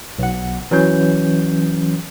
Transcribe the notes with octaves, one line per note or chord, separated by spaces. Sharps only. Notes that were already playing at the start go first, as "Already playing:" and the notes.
B1 F#5
E3 F#3 C#4 G6